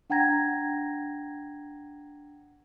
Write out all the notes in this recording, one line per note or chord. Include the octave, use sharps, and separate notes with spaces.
D4 F#5 G5 A#5 G#6 A#6